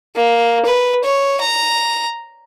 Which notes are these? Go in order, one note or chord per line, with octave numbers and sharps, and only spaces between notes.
A#3
B4
C#5
A#5